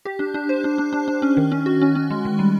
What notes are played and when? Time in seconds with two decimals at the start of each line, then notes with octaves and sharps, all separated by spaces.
0.05 G4
0.19 D4
0.34 D4
0.49 C5
0.64 D4
0.78 D4
0.93 D4
1.08 D4
1.22 C#4
1.37 D#3
1.52 C#4
1.66 F#4
1.81 C#4
1.95 C#4
2.10 G#3
2.25 D#3
2.39 G3